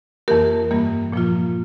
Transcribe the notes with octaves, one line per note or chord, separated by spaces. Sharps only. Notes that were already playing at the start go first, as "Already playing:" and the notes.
F2 E3 A#3 G4 A#4
G2 E3 G3 A#3
A#2 F3 A#3 F4